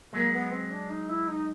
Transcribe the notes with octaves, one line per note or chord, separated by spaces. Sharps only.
F#3 G#3 A#3
B3
C4
D4
D#4
E4
D#4